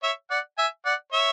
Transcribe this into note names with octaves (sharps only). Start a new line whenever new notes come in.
C#5 E5
D5 F#5
E5 G#5
D5 F#5
C#5 E5